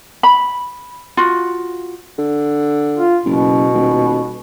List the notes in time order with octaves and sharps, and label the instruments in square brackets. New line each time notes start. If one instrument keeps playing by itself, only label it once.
[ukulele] B5
F4 F#4
[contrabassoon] D3
[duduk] F4
[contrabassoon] F#1 [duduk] B2
[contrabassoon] D#1